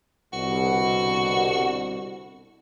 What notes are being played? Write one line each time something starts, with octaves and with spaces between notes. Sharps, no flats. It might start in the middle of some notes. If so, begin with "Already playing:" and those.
C2 B2 D3 F#4